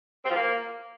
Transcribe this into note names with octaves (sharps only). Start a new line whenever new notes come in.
C4
F3
A#3